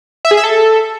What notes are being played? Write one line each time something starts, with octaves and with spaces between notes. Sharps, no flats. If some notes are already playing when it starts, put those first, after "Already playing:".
E5
G#4
E5
A4